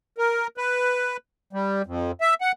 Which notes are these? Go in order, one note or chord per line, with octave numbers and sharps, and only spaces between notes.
A#4
B4
G3
F2
E5
F#5